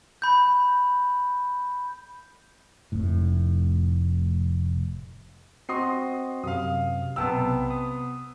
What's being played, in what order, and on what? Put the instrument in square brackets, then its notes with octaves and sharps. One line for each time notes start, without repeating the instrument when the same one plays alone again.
[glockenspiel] B5 G6
[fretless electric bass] F1 A2
[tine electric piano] C4 F#4 D#5 [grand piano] C6 D#6 C7
[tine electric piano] F#2 C3 [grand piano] F5 D#6
[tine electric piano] B1 G5 A5 [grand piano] C3 B3 E6
[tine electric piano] D#6